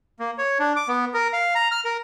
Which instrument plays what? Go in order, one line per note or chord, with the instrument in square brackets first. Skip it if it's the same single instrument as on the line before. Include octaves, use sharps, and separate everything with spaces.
[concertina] A#3
C#5
D4
D6
B3
A#4
F5
A#5
F6
A#4